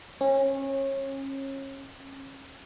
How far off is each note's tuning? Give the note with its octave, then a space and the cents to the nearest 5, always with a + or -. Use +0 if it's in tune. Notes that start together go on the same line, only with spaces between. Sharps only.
C#4 -30